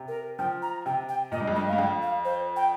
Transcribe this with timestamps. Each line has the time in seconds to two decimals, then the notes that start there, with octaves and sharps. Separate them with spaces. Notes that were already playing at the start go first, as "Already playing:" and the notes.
Already playing: C3
0.08 A#4
0.39 F3 G5
0.62 A#5
0.86 C3 G5
1.09 G5
1.32 A#2 D#5
1.40 G2
1.48 F2
1.56 G2 D#5
1.68 G2 F5
1.78 F2 G5
2.02 F5
2.25 C5
2.56 G5